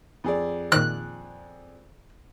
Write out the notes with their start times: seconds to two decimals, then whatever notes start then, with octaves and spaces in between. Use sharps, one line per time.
0.24 F2 G#4 D5
0.72 A#2 D#3 F#6